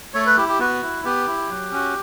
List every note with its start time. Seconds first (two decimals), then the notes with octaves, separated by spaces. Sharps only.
0.14 A3 C#5
0.26 B4
0.37 E4 G4
0.49 G4
0.59 B3 F#4
0.83 E4
1.04 B3 G4
1.27 E4
1.49 F#3
1.72 C#4 F#4